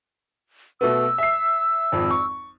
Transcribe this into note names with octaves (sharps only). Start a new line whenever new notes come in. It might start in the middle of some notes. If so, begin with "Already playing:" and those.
B2 A3 B3 E6
E5 C7
G#1 F2
C#6